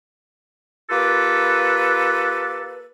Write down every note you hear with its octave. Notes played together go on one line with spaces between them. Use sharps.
A#3 F4 G4 A4 B4